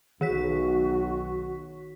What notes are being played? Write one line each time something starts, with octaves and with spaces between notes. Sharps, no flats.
B1 D#3 F#4 C#5 B6